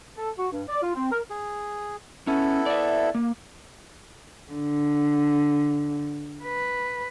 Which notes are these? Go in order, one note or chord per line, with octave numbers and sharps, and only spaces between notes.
A4
F#4
G2
D5
F4
C4
A#4
G#4
B3 C#4 E4 A4
D5 E5
A#3
D3
B4